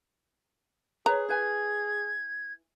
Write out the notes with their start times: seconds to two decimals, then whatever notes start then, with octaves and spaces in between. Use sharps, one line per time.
1.06 G#4 B4 C#5 A#5
1.28 E4 B4 G#5 G#6